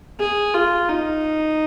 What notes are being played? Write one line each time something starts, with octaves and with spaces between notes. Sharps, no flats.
G#4
F4
D#4